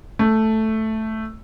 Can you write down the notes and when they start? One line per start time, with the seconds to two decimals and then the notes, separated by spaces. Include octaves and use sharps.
0.19 A3